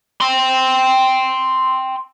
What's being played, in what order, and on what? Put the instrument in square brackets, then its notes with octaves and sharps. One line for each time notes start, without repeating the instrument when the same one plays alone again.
[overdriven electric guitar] G5 C6